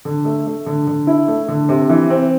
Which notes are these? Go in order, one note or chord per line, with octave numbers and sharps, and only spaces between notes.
D3
A3
A3
D3
D3
E4
A3
D3
C3
E3
C4